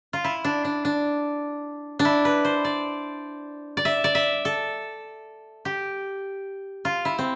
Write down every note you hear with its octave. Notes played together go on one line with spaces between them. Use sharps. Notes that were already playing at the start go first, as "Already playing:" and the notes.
F4
E4
D4
D4
D4
D4
E4
B4
C5
D5
D5
E5
D5
E5
A4
G4
F4
E4
C4